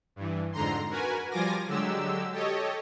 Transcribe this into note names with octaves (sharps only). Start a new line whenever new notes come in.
G2 E3
F2 G#2 D3 A#5 C6
F#4 A#4 B4 G#5
F3 G3 F4 G#5 D6 A#6
D3 F#3 G#3 G4 E6
G4 A4 C#5 D#5